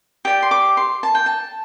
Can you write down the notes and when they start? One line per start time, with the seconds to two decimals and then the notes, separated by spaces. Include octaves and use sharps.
0.25 G4 D5
0.42 C6
0.51 D6
0.77 C6
1.03 A5
1.15 G5
1.26 A5